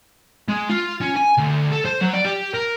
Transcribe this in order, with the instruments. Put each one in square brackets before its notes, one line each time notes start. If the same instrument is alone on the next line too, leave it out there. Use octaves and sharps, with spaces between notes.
[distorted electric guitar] G#3
F4
C#4
G#5
D2
A4
C5
F#3
D5
G4
A#4